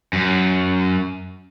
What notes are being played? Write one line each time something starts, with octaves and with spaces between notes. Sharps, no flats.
F#2